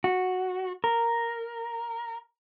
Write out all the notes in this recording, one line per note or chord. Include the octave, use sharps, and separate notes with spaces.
F#4
A#4